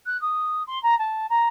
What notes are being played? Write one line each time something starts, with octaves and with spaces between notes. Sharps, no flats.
F#6
D#6
C6
A#5
A5
A#5